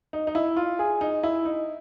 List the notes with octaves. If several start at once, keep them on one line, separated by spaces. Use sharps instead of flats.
D#4
D#4
E4
F4
G#4
D#4
E4
D#4